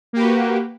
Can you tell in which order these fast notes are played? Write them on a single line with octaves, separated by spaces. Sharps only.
A#3 G4 B4 F#4